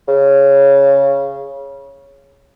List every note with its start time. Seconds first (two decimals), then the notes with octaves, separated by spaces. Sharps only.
0.08 C#3